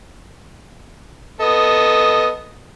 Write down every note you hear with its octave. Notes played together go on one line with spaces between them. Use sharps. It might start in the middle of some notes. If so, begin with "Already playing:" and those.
B3 A4 D#5